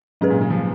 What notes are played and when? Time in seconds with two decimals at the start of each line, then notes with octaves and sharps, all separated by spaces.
0.21 G#2 F#3 C#4 G#4 B4
0.30 A#2
0.41 C#3
0.50 F3